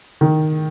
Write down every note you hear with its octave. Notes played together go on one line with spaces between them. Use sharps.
D#3